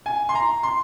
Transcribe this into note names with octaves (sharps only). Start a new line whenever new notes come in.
G#5
C6
A#5
C6